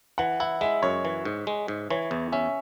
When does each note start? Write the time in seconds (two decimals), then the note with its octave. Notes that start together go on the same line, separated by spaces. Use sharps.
0.18 E3 F#5
0.40 E4 F#5
0.61 G#3 E5
0.82 F#2 C#5
1.05 E3
1.25 G#2
1.47 G#3
1.68 G#2
1.90 E3 C#5
2.11 E2
2.32 C#4 E5